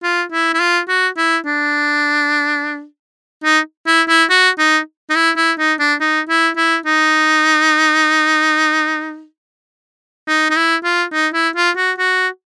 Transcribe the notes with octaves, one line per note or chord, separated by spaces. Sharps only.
F4
E4
E4
F4
F#4
E4
D4
D#4
E4
E4
F#4
D#4
D#4
E4
E4
D#4
D4
D#4
E4
E4
D#4
D#4
D#4
E4
F4
D#4
E4
F4
F#4
F#4